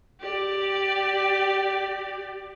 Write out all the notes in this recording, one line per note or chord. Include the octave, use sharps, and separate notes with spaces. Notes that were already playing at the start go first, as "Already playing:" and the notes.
G4 D5